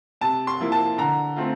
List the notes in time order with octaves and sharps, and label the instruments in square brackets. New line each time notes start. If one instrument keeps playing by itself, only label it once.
[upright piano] C3 A5
C6
F3 A#3 E4
A5
D3 A#5
A3 C4 F4